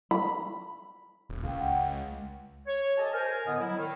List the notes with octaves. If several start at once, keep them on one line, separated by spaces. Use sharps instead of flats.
B5
D#1
C#2 F5 G5
F#5
G#3
C#5
G4 A4 D#5 G#5 A5
A#4 C5 G#5 F6
A2 D3 B3 D#5
F#3 G3 E4
D#3